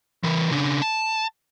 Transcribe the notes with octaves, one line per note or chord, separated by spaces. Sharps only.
E3 A#4
C#3 D4
A5